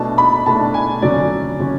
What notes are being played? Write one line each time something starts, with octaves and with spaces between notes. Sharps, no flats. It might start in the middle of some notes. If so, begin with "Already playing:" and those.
Already playing: B2 A3 D4 A5
B5
B2 A3 D4 A5
G#5
F2 D3 F#3 C#4 D5
D3 F#3 C#4